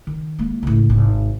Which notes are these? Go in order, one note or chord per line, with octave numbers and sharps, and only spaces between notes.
D#3
G#3 A#3
C#2 A2
G#1 C3